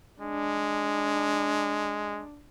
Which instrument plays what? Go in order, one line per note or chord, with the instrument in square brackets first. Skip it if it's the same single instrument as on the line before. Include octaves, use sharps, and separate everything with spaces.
[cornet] G#3 [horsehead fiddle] D4